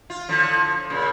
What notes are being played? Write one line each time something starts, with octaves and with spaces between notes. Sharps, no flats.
F4
A2 D3 F3
A#2 C#3